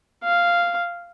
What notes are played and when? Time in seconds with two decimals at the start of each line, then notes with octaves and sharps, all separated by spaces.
0.23 F5